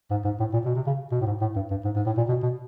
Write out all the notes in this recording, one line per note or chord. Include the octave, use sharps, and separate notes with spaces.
G#2
G#2
A2
A#2
B2
C3
C#3
B2
A2
G#2
A2
G2
G2
G#2
G#2
A2
A#2
B2
B2